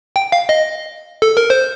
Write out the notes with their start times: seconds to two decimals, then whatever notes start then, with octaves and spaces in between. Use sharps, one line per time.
0.16 G5
0.32 F5
0.49 D#5
1.22 A4
1.37 A#4
1.50 C5